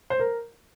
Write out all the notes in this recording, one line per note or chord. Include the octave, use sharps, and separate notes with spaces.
C5
A#4